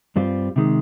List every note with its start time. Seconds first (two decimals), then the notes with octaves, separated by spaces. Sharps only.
0.16 G2 G3 C4 F4
0.56 C3 D#3 G#3